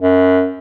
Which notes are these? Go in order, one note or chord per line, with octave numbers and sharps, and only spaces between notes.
F#2